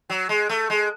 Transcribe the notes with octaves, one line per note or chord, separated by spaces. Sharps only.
F#3
G#3
A3
G#3